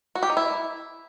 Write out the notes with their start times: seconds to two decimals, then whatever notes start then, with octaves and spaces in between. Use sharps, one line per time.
0.15 F#4
0.23 G4
0.30 D#4
0.37 E4